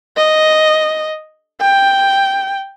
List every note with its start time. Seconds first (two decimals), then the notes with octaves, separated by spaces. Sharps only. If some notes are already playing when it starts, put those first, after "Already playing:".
0.17 D#5
1.61 G5